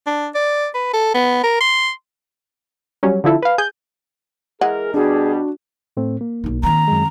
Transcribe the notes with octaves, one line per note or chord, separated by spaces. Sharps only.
D4
D5
B4
A4
B3
A#4
C6
F#3 G3 C#4
D3 F3 E4 A4
B4 F5
G#4 G#5 G6
E3 G#3 G#4 A#4 F#5
B2 G3 D4 F#4 G#4
A2 A3 C4
A#3
B1 D#4
D#3 C4 A#5
F#2 G#3